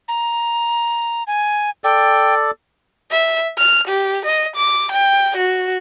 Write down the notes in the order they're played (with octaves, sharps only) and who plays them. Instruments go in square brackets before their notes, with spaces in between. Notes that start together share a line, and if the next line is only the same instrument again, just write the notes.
[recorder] A#5
G#5
[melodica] A4 D5 [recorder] G5
[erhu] E5
F6
G4
D#5
D6
G5
F#4